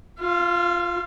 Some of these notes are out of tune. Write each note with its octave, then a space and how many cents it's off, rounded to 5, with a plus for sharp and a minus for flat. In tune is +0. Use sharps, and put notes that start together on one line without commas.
F4 +0 F5 -45